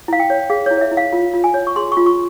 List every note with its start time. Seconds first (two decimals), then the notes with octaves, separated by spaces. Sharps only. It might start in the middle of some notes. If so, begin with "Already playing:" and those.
0.08 E4 F5
0.20 G5
0.30 C#5
0.50 G#4 F5
0.66 C#5
0.71 E4
0.77 C#5
0.81 E5
0.91 E4
0.97 F5
1.13 F4
1.34 F4
1.44 G#5
1.54 C#5
1.67 C#6
1.76 G#4 C6
1.92 C#6
1.97 F4
2.06 C#6